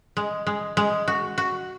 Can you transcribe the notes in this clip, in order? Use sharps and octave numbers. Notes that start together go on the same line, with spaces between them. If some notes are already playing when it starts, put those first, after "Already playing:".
G#3
G#3
G#3
F#4
F#4